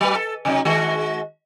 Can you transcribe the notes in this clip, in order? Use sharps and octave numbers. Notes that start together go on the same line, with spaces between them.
F#3 B4
A4
C3 F#3 D#4
D#3 G#3 F#4